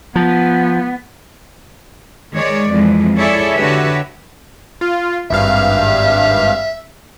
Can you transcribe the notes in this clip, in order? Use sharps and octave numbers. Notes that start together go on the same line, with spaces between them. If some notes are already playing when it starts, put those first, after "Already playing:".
F3 B3
D#3 G#3 C#5 D5
F2 E3 G#3
E4 G#4 A4 C#5 D5 E5
D3 F#4 G4 B4 C#5 E5
F4
G#1 G2 E5 F5